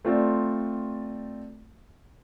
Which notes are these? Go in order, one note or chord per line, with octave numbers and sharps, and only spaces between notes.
A3 C4 F4 A4 D5